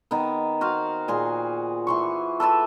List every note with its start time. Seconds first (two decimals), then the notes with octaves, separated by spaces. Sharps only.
0.11 D#3 B3
0.61 F#4 C5 F5
1.08 A#2 G#4 C6
1.87 E3 C6 C#6
2.40 A4 B4 E5 A5